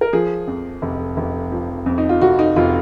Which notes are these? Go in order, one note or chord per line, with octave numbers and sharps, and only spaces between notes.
A#4
F3 G#4
F2
F1
F1
F3
F2
D#4
F4
F1 F#4
D#4
F1 F4